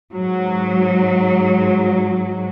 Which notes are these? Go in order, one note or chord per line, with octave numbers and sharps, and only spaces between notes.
G#2 F#3